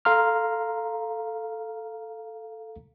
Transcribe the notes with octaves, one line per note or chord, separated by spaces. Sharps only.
A4 F5 A#5 C6 F6